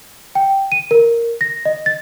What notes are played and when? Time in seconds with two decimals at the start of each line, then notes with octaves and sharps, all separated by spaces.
0.35 G5
0.72 D#7
0.91 A#4
1.41 A#6
1.65 D#5
1.86 A6